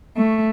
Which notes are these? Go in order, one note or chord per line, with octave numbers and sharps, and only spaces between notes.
A3